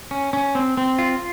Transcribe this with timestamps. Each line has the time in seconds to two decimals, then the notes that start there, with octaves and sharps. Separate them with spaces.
0.11 C#4
0.33 C#4
0.55 C4
0.77 C4
0.99 F4